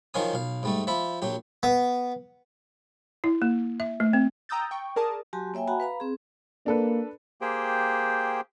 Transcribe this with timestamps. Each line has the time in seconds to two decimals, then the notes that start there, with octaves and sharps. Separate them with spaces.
0.14 D#3 F3 F#3 F5 G#5 D#6
0.33 B1 F5
0.63 G#2 G3 A3
0.87 F3 E5 B5
1.22 A#1 F#3 G4
1.63 B3
3.24 E4
3.42 A#3
3.80 E5
4.00 A3
4.13 C4
4.49 G5 A#5 D#6 E6 G6 A6
4.71 G5 C#6
4.96 G#4 A#4 D5 A5 D#6
5.33 F#3 F#4 G4 G#5 A5 C6
5.54 A#3 C#5 E5 G5 G#5
5.68 F#4 E5 F#5 G#5 A#5 B5
5.80 B4 F5 A#5 B5
6.00 C4 G#4
6.66 A#3 D4 A4 B4
7.41 A#3 G4 G#4 C5 G5